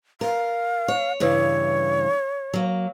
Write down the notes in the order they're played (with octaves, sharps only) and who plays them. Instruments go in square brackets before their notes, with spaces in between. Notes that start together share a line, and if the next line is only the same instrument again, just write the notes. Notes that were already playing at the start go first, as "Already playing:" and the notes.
[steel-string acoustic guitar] A#4 [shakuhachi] F5
[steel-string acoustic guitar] C#5
[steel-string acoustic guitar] G2 C#3 E3 [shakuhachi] C#5
[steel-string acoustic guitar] F#3 A#3